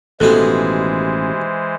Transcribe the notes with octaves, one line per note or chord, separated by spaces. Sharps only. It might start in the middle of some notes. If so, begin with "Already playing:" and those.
A1 D#2 B2 E3 G#3 B3 A4 C5